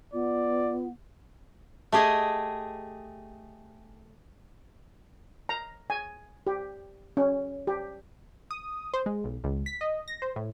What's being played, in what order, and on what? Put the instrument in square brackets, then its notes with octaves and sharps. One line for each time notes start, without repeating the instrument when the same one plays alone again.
[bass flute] B3 [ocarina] F4 [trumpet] D5
[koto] A3 G4 G#4 D#5
[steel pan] A#5
G#5
G4
C#4
G4
[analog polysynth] D#6
C5
G#3
B1
C#2
B6
D#5
A#6
C5
A2